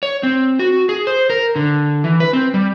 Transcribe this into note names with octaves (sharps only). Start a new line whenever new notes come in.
C#5
C4
F#4
G#4
C5
A#4
D3
E3
B4
C4
G3